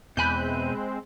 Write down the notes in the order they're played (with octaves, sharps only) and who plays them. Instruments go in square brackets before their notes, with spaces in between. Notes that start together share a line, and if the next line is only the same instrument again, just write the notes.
[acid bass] E2 [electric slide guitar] B2 G#5 [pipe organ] G#3 C4 [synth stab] B5 F#6 G6